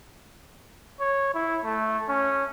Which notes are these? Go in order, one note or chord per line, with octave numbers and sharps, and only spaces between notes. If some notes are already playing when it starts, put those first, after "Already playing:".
C#5
E4
A3
C#4